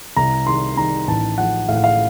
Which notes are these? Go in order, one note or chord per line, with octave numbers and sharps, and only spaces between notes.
C2 A#5
D#3 C6
D#3 A#5
A1 A5
F3 F#5
A2 F5
F#5
F5